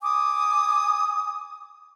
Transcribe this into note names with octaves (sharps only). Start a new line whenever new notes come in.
G#5 D6 D#6